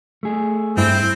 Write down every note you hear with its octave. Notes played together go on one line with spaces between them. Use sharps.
A3 G#4
G2 C4 E4